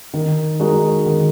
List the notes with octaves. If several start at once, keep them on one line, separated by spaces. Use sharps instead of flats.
D#3
G#3 D#4 F#4 A#4
D#3